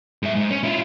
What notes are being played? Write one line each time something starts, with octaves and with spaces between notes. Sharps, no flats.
G#2 E5
G#2
C#4
E4 F4